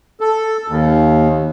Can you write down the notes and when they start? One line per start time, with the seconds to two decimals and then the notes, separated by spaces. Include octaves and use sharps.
0.20 A4
0.68 D#2